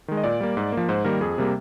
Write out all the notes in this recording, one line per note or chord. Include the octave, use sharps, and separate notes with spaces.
D#3 G#3
D#5
A#2 D5
G3 A#3
G#2
F3 A#3
G#2 C5
D#3 G3 A#3 A#4
F2 G#4
C3 G3 A#3